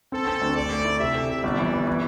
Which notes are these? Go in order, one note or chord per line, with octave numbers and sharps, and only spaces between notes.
C4 A4
C4
D2
A3 D5
A3
E4
C3 E5
A4
C3
G1 D5
E3
E3
E3